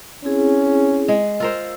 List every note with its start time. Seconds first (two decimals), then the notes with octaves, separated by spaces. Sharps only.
0.24 C4 C#4 E4 G#4
1.08 G#3
1.40 F4 A#4 C5 E6